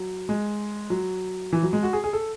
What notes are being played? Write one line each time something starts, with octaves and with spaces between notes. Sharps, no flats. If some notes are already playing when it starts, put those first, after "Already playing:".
Already playing: F#3
G#3
F#3
E3
F#3
G#3
F#4
G#4
G#4
A4